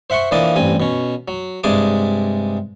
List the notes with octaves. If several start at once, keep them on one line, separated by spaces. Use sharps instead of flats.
C5 E5 F#5 C6 C#6
E3 F3 A#3 D4 D#5 A5
A1 G2 C4 G#5
B2 C#4
F#3
G2 C3 G#3 G#4 A5 D6